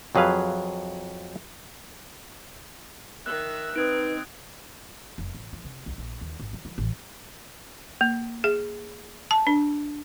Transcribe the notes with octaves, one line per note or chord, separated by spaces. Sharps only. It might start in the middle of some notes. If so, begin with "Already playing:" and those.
F2 F#3 G#4 B4 F5
D#3 E5 F#6
C4 D#4 B4 D#6 G#6 D7
F1
A1
F3
C3
C2
A#1
D#2
G#1
F#3
F3
A1
A#3
G#4
A5
D4